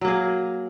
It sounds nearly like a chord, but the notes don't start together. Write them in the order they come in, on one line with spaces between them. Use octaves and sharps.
F#3 A#3 G#4